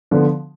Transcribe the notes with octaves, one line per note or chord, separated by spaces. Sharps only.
D3 F3 B3